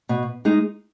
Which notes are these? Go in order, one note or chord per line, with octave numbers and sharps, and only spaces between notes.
B2
G#3 D#4